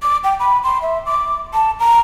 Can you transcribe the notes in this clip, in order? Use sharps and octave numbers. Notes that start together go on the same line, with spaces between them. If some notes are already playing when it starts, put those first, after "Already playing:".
D6
G5
B5
C6
E5
D6
A5
A#5